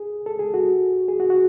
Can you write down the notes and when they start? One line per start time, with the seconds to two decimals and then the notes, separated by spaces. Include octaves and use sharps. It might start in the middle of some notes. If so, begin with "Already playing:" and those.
Already playing: G#4
0.26 A4
0.39 G#4
0.54 F#4
1.08 G#4
1.20 F#4
1.30 F#4